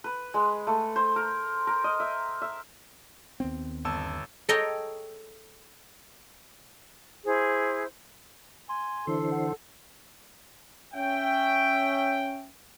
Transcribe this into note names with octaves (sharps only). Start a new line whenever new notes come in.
B4
G#3
A3
C5
A#4
A#4
D#5
E5
E5
D#2 B3 C4
G1 A5 E6
A4 C#5 D#5 G5 G#5 A#5
E4 G#4 C5
G#5 C6
D3 E3 A4 C5
F#5
C#4 E5 G5